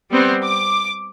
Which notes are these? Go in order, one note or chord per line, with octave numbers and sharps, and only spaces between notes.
G3 B3 C4
D6